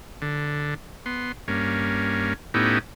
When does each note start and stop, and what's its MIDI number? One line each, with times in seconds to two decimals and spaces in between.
0.22 0.74 50
1.06 1.32 59
1.06 1.32 84
1.48 2.33 43
1.48 2.33 58
1.48 2.33 61
2.54 2.79 45
2.54 2.79 59
2.54 2.79 61
2.54 2.79 63
2.54 2.79 64
2.54 2.79 67